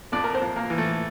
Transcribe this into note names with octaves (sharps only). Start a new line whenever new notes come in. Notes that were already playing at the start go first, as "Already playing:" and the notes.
F2 D4 D5
A#4
C4 C5
F2
A#3 A#4
E3
A3 A4